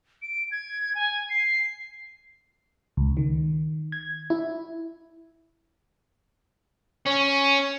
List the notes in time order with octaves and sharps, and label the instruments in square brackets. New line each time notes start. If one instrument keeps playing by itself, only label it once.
[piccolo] D7
G#6
G#5
C7
[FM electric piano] C#2
D#3
G#6
E4
[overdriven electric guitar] C#4